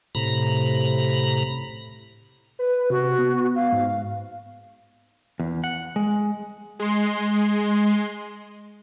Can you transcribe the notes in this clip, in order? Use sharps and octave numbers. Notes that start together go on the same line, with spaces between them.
A2 C3 A#5 B5
B4
C3 F#4
B3
F5
G#2
E2
F#5
G#3
G#3 C6